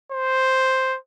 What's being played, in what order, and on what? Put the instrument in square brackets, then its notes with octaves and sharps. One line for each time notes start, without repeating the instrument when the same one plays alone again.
[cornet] C5